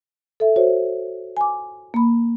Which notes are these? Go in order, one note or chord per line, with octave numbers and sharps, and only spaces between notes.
A4 E5
F#4 C5 C#5
G#5 D6
A#3 B5